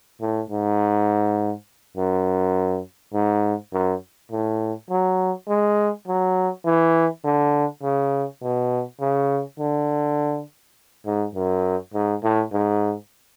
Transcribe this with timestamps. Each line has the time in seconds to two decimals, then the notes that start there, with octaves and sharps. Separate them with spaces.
0.21 A2
0.50 G#2
1.97 F#2
3.14 G#2
3.73 F#2
4.32 A2
4.90 F#3
5.48 G#3
6.08 F#3
6.66 E3
7.24 D3
7.83 C#3
8.42 B2
9.00 C#3
9.59 D3
11.06 G#2
11.35 F#2
11.94 G#2
12.23 A2
12.52 G#2